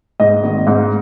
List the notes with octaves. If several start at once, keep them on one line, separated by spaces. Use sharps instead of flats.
G#2 D#5
G#1
G#2